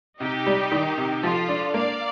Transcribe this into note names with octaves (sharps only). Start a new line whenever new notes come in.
C3 D#4 G4
G3
D#3
C3
F3 F4 A4
D4
A#3 D5 F5